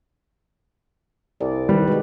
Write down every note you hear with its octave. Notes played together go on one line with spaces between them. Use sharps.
C2 D5
D#3 G3 B4
B2 G#3 G4